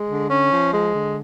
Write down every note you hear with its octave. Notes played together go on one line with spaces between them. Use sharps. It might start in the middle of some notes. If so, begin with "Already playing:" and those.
Already playing: G#3
D3
C#4
F3
G#3
D3